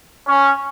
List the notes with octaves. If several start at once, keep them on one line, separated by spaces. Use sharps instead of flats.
C#4